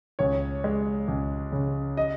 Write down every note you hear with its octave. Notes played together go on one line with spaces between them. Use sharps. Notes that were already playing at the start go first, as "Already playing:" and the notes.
C#2 C#5
G#3
C#2
C#3
D#5